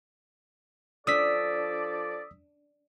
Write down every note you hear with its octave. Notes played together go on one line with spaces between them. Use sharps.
F3 D4 A4 D5 D#6 E6 B6